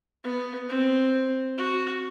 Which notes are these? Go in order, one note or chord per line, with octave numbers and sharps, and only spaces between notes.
B3
C4
F#4